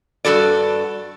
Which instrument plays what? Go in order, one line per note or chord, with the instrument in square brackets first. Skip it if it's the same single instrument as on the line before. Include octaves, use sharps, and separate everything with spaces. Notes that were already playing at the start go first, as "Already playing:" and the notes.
[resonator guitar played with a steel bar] G2 C#3 F#4 A4 D5